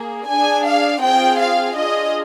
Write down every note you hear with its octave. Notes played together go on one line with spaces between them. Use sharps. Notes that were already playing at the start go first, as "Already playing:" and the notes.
Already playing: A#3 G#4
D4 G#4 G#5
F5
C4 F4 G#4 G5
F5
D4 F4 G#4 D#5